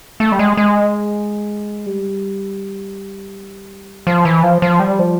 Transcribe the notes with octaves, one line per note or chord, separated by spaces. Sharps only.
A3
G3
G#3
G#3
G3
F3
E3
F3
F3
G3
F3